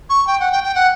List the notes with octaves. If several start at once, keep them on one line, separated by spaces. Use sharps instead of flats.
C#6
G5
F#5
G5
G5
F#5